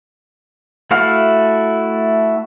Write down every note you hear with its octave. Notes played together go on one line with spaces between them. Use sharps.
A3 E4 F#4 F5 F6